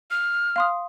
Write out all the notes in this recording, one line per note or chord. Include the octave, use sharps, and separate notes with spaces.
F6
F5 C6 D#6